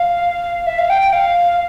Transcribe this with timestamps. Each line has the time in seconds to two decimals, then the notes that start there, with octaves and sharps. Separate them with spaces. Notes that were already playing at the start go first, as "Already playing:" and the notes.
Already playing: F5
0.67 E5
0.79 F5
0.90 G5
1.02 G5
1.13 F5